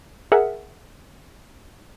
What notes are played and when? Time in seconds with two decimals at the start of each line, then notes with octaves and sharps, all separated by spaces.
0.32 G#4 A#4 E5 F#5